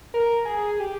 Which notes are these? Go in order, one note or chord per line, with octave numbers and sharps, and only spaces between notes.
A#4
G#4
G#4
G4